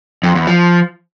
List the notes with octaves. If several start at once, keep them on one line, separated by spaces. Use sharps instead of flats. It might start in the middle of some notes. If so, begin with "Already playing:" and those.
F2
E2
F3